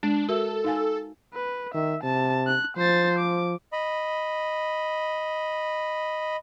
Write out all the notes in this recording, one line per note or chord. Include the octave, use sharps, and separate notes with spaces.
G#3 D4
F#4 A4 A#4 E5
D#4 F5 G#5
B4
D#3 E5
C3 A5
F#6
F3 C5 A6
D6
D#5 B5